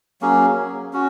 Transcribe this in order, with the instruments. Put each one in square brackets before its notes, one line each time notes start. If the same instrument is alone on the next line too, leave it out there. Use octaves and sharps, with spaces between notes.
[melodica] F#3 A#3 C#4 G#4
C#4 F#4